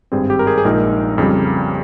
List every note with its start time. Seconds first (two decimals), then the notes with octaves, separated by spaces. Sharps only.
0.12 G#1 G2 G3 C4 G#4
0.30 G4
0.39 A#4
0.47 G#4
0.58 G#4
0.65 A#1 A#2 G#3 D#4 A#4
1.18 F2 C#3 G3